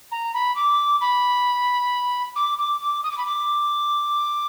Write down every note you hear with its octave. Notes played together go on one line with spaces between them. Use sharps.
A#5
B5
D6
B5
D6
D6
D6
D#6
D6
B5
D6